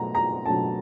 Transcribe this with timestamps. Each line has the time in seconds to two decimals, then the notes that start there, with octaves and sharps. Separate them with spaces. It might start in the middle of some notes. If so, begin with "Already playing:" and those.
Already playing: B2 F#3 A3 A#5
0.15 A#5
0.45 B2 F#3 A3 D4 A5